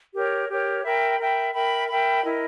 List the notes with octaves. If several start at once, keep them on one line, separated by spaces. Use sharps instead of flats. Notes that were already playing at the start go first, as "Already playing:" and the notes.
G4 A#4 C#5
G4 A#4 C#5
A#4 E5 G5 B5
A#4 E5 G5 B5
A#4 E5 G5 B5
A#4 E5 G5 B5
E4 A#4 D#5